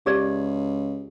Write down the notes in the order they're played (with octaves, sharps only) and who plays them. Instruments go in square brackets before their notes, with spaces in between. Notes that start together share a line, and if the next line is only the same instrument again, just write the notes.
[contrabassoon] C#2 [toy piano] G4 G#4 D5